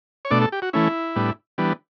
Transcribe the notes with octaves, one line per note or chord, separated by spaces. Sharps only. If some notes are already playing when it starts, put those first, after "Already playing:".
C#5
B2 A3 D4 D5
A4
G4
F#4
E3 A3 C#4 E4
A2 G3 B3 D4
E3 G3 B3 D4